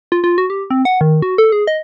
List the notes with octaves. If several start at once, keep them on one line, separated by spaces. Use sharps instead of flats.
F4
F4
F#4
G4
C4
F#5
D#3
F#4
A4
G#4
D#5